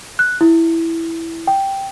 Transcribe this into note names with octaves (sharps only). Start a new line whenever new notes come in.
F#6
E4
G5